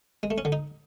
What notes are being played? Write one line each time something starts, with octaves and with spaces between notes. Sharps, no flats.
G#3
A3
C#4
D3
D#4